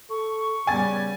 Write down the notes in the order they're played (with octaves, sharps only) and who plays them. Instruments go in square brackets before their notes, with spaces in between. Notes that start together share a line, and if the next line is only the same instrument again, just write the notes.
[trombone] A4 [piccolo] C#6
[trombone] C#3 [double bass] G3 B3 [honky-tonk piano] G#5 A6